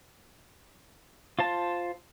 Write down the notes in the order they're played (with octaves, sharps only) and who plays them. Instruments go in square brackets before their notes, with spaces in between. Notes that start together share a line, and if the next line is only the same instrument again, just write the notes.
[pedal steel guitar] F4 C5 A5